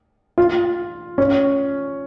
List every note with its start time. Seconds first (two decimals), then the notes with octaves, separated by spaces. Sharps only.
0.38 F4
1.18 C#4